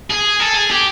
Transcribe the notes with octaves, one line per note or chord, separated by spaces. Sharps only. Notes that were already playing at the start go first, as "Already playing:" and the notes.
G#4
A4
G#4
G4